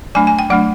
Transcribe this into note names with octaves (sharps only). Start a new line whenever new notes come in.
F#3 A3 D4 G#5
G#5
G5
F#3 A3 D4 F#5